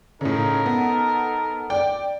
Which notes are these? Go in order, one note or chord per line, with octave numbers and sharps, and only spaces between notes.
A2 C#3 D#4 A4 A#4
B3
D5 G5